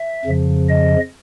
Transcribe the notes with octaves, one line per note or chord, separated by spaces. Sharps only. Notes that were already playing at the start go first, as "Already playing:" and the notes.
Already playing: E5
F2 C#3 F3
D#5